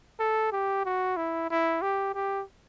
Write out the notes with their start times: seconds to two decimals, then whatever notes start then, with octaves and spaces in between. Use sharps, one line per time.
0.20 A4
0.53 G4
0.85 F#4
1.17 E4
1.50 E4
1.82 G4
2.15 G4